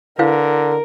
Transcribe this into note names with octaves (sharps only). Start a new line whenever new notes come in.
D3 E4 A#4 B4 F5